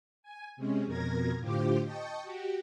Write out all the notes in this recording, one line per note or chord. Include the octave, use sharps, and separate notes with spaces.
G#5
C3 G#3 C#4
F2 B2 A#4 G#6 A#6
A2 D3 F4 G4 C5 D6
D#5 G5 A5 C#6
F#4 G4